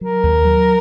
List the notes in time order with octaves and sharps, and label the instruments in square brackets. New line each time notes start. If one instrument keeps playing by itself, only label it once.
[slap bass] F#3 [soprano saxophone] A#4
[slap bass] D#2
F#3